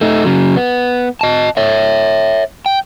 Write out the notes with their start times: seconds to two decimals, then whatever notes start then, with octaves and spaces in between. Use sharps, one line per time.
0.01 A3 D#4
0.25 C#3 F#3
0.57 B3
1.21 D#5 A5
1.57 C#5 E5
2.66 G5